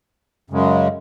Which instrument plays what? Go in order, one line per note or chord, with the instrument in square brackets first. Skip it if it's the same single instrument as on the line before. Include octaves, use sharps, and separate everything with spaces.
[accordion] F#2 C#3 G#3